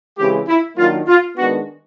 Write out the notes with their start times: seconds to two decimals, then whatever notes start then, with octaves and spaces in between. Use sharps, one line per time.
0.18 C#3 E3 G#3 C4 G4
0.48 E4
0.78 D#3 F#3 A#3 D4 F4
1.08 F4
1.38 D#3 G#3 B3 D4 F#4